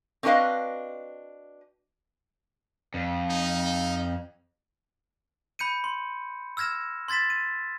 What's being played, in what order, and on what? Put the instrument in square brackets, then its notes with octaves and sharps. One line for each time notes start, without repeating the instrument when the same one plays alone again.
[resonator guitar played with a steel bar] C4 D4 F#4 B4 D#5 F5
[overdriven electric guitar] F2
[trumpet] D#4
[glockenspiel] B5 G6 C#7 D#7
C6
E6 F6 G#6 A#6 E7
C6 G#6 A6 B6 E7
D#7